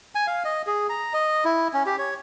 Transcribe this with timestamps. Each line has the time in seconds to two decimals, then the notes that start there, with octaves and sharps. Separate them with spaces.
0.15 G#5
0.27 F5
0.45 D#5
0.67 G#4
0.89 A#5
1.13 D#5
1.45 E4
1.74 C#4
1.86 G4
1.99 C#5